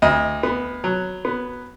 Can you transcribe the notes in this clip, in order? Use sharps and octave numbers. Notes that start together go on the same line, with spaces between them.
D2 D#5
B3
F#3
B3